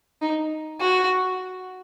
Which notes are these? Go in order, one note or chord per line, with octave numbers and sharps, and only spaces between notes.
D#4
F#4